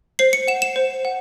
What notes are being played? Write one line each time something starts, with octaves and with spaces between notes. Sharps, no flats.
C5 C7
C#7
F#5 E7
E7
C5
F#5